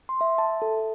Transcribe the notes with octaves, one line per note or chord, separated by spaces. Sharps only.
C6
E5
A5
A4